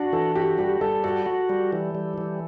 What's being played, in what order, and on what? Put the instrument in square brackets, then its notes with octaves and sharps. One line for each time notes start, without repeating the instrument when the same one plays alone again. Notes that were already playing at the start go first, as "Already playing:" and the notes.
Already playing: [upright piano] D4 [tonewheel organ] F#4
[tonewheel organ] E3 [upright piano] A4
[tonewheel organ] F#4 [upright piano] G4
[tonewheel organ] G3 [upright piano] G4
[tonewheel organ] G3 [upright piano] A4
[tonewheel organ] F#4 [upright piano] A4
[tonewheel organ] F#4
G3
E3
G3
E3